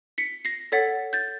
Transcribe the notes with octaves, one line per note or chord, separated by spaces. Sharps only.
B6 C#7
A#6 C7
A4 C#5 F#5 A6 B6
G6 A6